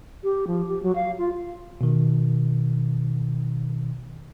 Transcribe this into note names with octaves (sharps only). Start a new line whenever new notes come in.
G4
F3
G4
F#3
F5
F4
B2 D#3